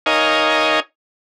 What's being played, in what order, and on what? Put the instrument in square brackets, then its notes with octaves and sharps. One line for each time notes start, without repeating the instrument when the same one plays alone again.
[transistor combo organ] D#4 A#4 C#5 D#5 F5 G#5